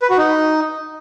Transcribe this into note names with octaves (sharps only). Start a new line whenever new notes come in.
B4
F#4
D#4